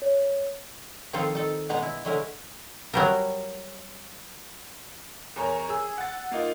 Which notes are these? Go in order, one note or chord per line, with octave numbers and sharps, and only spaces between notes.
C#5
D#3 F3 C4 D#4 F4 A4
D#4 A4
B2 G#3 B3 D#5 A#5
E4
D3 F#3 G#3 E4 A#4
F#3 G3 A#4
E2 A#4 C#5 A#5
G#4 E6
F#5 A6
A#3 D#4 F4